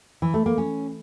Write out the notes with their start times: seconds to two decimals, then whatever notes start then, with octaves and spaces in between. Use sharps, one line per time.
0.22 E3
0.34 A3
0.46 A#3
0.58 C#4